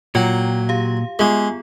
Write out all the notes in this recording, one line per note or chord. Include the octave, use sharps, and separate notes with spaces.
A#2 F#3 F4 G5
G4 F5
G#3 B3 F4 G#4